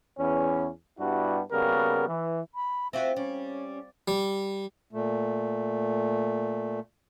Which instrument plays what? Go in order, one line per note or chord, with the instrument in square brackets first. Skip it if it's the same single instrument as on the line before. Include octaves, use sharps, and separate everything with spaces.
[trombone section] E2 C#4
G2 G3 B3 D4 E4 F#4
C#3 G3 A#3 B3 F#4 A#4
E3
[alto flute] B5
[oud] C4 F4 F#4 [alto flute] E5
[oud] G3 [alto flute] C#4
[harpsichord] G3
[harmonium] A#2 A3